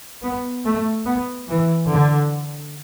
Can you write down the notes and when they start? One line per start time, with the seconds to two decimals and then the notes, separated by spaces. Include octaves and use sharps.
0.22 B3
0.65 A3
1.05 B3
1.49 E3
1.90 D3